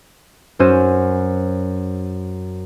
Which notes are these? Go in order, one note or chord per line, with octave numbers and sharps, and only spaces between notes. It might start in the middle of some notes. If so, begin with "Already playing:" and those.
F#2 C#4 F#4 C5 E6 D#7